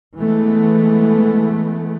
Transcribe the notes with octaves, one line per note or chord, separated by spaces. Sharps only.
E3 G#3 A3 B3